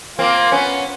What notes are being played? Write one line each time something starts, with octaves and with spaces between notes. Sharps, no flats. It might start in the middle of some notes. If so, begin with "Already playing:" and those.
A#3 C4 F4
B3 C#4